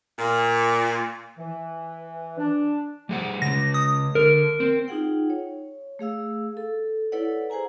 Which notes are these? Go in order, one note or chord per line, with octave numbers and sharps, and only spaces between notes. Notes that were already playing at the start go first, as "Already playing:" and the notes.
A#2
E3
D4
G3 G#4 F#5
C#3 G#3 A#6
D#6
D3 A#4
C4
D#4 F4 G#4 F#5 G5
C#5
A3 G#4 F5 E6
A4
E4 A4 B4 C#5 D5 F#5
G#4 C5 F#5 G#5 A#5